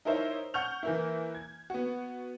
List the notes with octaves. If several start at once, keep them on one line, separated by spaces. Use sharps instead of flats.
D#4 E4 A#4 C5 C#5 E5
F#5 C#6 F6 G6 F7
E3 A#3 E4
G#6
B3 F#4